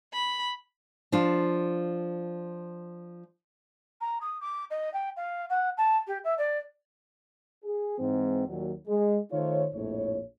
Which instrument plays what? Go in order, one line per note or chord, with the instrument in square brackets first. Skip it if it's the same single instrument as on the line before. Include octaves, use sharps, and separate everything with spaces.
[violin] B5
[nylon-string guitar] F3 D4 F4
[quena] A#5
D#6
D6
D#5
G5
F5
F#5
A5
G4
E5
D5
[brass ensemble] G#4
G#2 E3 C4
D#2 A#2 F#3
G#3
D#3 A3 D#4 F4 C5 C#5
A#1 F2 A2 A3 C#5